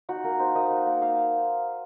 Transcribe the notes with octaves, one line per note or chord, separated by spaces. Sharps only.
D#4 F#4
A#3 A#4
D#4 C5
A#3 D#5
D#4
A#3
D#4 F5